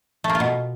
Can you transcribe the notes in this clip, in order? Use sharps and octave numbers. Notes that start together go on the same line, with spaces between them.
A3
A#3
F4
B2